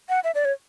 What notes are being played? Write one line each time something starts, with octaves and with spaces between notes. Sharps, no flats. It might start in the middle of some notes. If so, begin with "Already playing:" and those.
F#5
E5
D5
C#5